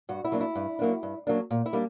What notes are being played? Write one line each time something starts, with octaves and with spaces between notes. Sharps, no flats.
G2 F#4
E4
F#3 A#3 D4
E4
G2
F#3 A#3 D4
G2
F#3 A#3 D4
A#2
E4
G3 A#3 D4